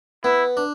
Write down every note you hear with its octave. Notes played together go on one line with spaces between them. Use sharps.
B3 E4
D4